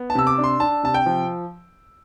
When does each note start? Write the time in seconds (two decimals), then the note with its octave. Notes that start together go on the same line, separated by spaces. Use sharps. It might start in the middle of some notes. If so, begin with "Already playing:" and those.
Already playing: B3
0.10 A5
0.15 C3 E6
0.27 D6
0.38 D4
0.44 C6
0.60 D4 A5
0.83 C3 A5
0.94 G5
1.06 F3